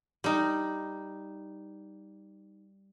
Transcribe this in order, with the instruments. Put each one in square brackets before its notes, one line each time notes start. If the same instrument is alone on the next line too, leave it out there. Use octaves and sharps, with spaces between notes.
[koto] G3 D#4